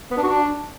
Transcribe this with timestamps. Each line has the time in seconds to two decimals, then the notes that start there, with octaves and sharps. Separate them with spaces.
0.11 B3
0.17 D4
0.23 F#4
0.29 D4